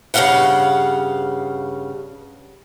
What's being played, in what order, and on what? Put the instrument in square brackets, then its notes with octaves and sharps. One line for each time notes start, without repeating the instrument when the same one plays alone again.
[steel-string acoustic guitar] G2 C#3 A3 A#3 F5 F#5